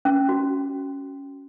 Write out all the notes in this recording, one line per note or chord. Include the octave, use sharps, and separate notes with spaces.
C#4
F#4